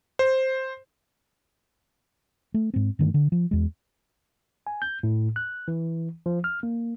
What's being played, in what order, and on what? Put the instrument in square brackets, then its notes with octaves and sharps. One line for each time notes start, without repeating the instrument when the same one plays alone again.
[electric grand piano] C5
[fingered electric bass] A3
G#2 C4
G2 D3 D#3 A3
D3
F3
E2 G#3
[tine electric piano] G#5
G6
A2
F#6
E3
F3
F6
A#3